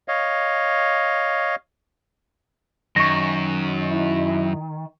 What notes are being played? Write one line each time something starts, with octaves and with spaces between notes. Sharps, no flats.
C#5 D#5 F5
F#2 D#3 C#6 A#6
E4